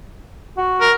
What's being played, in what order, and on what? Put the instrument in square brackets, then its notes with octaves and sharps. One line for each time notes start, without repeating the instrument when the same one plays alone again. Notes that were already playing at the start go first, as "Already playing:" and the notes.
[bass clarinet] F#4
[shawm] A#4